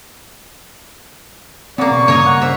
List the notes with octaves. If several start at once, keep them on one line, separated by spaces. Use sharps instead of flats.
C#3 A#3 C4 D5 F#5
B2 C#6
G2 C#3 A#3 D#4 A#4 C#5
F#5
C5 E5